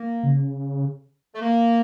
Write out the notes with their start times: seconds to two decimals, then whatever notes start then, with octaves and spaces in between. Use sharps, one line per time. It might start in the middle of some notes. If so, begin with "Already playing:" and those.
Already playing: A#3
0.23 C#3
1.35 A3
1.40 A#3